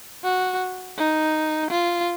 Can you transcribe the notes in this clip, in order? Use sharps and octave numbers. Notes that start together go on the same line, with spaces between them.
F#4
D#4
F4